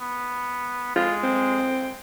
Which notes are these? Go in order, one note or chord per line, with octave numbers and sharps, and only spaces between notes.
B3
G#3 F4
C4